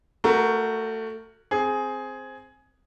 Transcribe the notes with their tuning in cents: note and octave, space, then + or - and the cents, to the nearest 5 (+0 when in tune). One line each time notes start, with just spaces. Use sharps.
A3 +20 F#4 +0 A#4 +0
C4 +0 G#4 +10